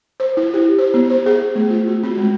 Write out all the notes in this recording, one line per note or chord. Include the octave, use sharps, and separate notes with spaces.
C5
E4
G4
C5
B3
C5
G#4
A3
F4
F#4
C4
G#3